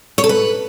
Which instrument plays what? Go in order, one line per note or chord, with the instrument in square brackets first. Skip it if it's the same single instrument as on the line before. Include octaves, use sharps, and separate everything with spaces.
[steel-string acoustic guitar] C#5
A4
B4